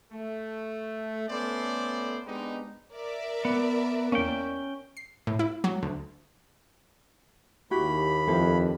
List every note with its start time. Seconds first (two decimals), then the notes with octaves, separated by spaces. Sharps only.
0.12 A3
1.29 A3 B3 C#4 A4 C5 D5
2.26 G#3 B3 C4 D4 D#4 G4
2.93 A#4 D5 E5
3.45 B3
4.12 E2 A#3 C#4 G5
4.97 C7
5.27 A2
5.39 E4
5.64 F#3
5.82 D2
7.71 D#2 E4 F#4 G4 B5
8.28 F2 E4 A4 C5